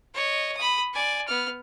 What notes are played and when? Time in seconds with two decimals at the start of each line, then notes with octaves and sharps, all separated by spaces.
0.14 C#5 D#5
0.57 B5 D#6
0.94 D5 G#5
1.27 B3 F6